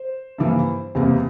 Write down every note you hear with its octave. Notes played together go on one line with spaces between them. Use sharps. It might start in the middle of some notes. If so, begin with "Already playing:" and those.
Already playing: C5
G2 E3 A#3
E2 C3 G3 A#3